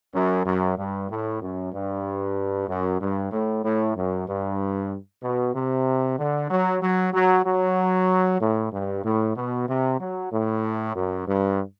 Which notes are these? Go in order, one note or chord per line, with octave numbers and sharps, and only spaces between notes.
F#2
F#2
G2
A2
F#2
G2
F#2
G2
A2
A2
F#2
G2
B2
C3
D3
F#3
F#3
F#3
F#3
A2
G2
A2
B2
C3
F#3
A2
F#2
G2